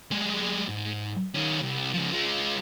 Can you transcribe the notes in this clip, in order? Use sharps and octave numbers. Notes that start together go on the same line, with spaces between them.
G3 G#3
G#2
D#3 C#4
C2
C#3 F3
G#3 F4